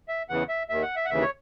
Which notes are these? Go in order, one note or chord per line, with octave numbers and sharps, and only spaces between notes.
E5
E2 C#3 E3 F#5
E5
D#2 D#3 E5
F#5
E5
F#5
D#2 C#3 E3 E5
C#5